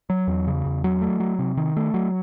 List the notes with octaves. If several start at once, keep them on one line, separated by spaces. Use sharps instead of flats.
F#3
E2
C#3
E2
F#3
A3
F#3
C3
D#3
A3
F#3